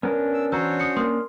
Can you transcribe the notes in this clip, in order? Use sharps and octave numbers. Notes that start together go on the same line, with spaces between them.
B3 C#4 D4 A#4
E6
E2 F#4 C5 C#5 A#5 E6
D#6 C#7
A#3 C6 D#6